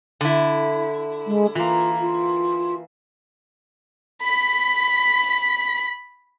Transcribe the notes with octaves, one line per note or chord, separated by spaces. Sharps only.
D3 E4
G#3
E3 A#3 F4
F4
B5 B6